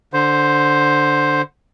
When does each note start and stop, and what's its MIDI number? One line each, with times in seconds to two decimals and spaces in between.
0.13 1.42 50
0.13 1.42 72